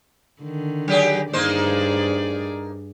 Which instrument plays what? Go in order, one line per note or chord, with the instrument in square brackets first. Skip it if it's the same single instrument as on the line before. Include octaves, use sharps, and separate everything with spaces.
[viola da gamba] D3 D#3
[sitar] F#3 G4 G#4
[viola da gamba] G2 G#4 D5 [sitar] A#3 D#4 C5